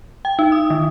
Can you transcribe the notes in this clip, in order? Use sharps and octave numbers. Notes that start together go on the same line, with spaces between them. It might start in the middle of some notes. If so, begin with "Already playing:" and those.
G5
D#4
D#6
D#3